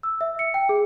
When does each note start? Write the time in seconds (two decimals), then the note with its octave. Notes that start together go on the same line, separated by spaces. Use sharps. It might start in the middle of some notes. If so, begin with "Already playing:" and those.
0.03 E6
0.21 E5
0.39 C#7
0.54 G5
0.69 G#4